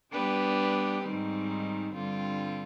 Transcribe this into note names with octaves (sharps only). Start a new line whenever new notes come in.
G3 B3 D4 G4 B4
G#2 D#3 G3 C4
G2 D3 G3 C4 F4